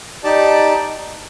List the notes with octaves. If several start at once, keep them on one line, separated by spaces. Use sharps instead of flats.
D#4 G4 D5 A5